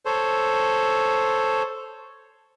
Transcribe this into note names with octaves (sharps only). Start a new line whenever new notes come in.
A4 C5 C#5